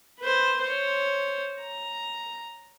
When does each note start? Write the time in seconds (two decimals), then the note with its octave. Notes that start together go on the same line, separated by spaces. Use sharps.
0.19 B4 C5
0.62 C5 C#5
1.60 A#5